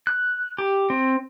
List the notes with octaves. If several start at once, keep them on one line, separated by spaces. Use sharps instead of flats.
F#6
G4
C4